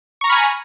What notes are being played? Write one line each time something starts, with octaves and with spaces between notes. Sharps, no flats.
G#5 A#5 B5 C#6 F6